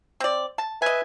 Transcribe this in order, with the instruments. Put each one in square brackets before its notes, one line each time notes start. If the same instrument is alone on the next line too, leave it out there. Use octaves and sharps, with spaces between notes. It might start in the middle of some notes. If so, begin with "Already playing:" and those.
[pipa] C4 D5
A5
[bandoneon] B4 E5 [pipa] D#5 G#5